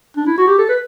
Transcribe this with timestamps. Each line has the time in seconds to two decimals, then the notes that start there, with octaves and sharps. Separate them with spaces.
0.17 D4
0.27 E4
0.38 F#4
0.47 G4
0.59 A4
0.69 B4